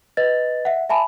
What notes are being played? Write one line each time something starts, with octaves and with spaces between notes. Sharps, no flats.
B4 D#5 A6
E5 F#5
E5 G#5 A5 B5